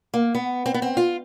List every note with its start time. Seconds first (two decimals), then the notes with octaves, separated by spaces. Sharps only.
0.14 A#3
0.35 B3
0.66 C4
0.74 B3
0.82 C4
0.97 F4